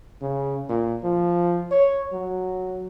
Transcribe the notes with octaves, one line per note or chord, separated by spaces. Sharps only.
C#3
A#2
F3
C#5
F#3